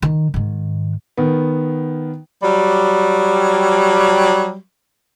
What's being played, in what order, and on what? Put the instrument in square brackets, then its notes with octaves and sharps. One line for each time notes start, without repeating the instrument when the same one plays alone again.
[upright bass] D#3
G#2 D#3
[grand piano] D#3 B3
[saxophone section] F#3 G3